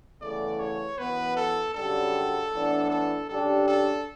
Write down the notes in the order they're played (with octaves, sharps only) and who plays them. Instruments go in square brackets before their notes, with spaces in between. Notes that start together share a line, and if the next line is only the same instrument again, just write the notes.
[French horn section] E2 C#3 E3 A3 [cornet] D5
[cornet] C#5
[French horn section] F#2 E3 B3 [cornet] B4
[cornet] A4
[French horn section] F#2 C#3 G3 D4 G4 [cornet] A4
[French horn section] A2 E3 B3 D4
[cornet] A4
[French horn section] C#3 G3 D4 G4 [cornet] A4
[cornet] A4